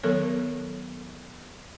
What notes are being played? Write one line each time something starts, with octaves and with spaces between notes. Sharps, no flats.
D#3 F#3 B3 A4 A#4 C#5